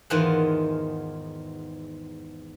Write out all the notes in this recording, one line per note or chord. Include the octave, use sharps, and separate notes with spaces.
E2 G#2 D#3 E3 F4 F#5